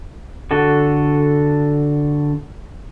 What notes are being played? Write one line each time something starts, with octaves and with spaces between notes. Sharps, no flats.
D3 F#4 A4